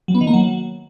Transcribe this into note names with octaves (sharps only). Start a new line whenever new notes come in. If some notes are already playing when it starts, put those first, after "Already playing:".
F#3
B3
D#3
A#3
F#3